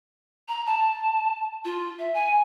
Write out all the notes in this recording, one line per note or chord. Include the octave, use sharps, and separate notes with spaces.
A#5
A5
F4
E5
G#5